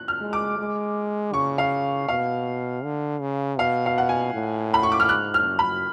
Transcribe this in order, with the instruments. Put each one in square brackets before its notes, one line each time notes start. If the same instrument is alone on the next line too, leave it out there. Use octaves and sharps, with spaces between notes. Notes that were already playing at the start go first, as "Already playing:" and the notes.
Already playing: [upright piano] F#6
F6
[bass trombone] G#3
[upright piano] D6
[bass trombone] G#3
[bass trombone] C#3 [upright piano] C#6
[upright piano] F5
[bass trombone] B2 [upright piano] F5
[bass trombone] D3
C#3
[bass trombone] B2 [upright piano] F5
[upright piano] F5
F#5
G#5
[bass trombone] A2
[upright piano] B5
C#6
D6
F6
[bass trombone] G#2 [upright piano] F#6
[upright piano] F6
[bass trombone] F#2
[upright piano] B5